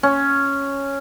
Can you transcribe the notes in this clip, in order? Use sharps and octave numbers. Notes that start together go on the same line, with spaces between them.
C#4